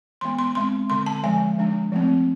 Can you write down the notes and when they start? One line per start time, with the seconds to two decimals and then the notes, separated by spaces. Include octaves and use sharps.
0.21 E3 G#3 B3 C6
0.39 C6
0.55 G#3 C4 C6
0.90 D3 G#3 C4 C6
1.06 A5
1.24 D3 F3 G#3 G#5
1.58 F3 G#3 D4
1.92 F3 A3 C4